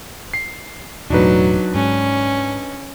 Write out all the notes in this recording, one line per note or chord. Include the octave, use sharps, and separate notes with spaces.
C7
E1 A2 F#3 D4 D#4 B4
G#2 C#4